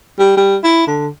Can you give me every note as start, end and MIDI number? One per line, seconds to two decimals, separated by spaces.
0.19 0.33 55
0.37 0.56 55
0.64 0.85 64
0.87 1.07 50